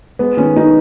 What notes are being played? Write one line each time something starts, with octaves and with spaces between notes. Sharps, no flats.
G#3 B3
D#3 C#4
D#4